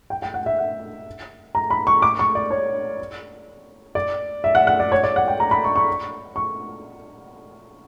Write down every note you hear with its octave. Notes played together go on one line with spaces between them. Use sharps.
G5
G5
F#5
E5
F#5
A#5
B5
C#6
D6
C#6
D5
C#5
D5
E5
F#5
F#5
D5
C#5
D5
F#5
G5
A#5
B5
C#6
C#6
C#6